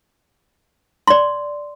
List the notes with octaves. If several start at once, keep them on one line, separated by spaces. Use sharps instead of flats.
D5 C6